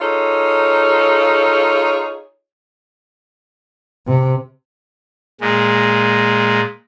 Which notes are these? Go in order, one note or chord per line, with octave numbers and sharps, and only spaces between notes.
D#4 F4 G#4 A4 C#5
C3
A#2 G#3